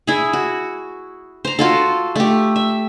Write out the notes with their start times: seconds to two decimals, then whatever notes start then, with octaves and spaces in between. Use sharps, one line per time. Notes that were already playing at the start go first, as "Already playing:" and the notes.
0.07 E4 G#4
0.33 F#4
1.45 C5 A#5
1.59 F4 F#4 A4
2.16 A3 G4
2.56 E5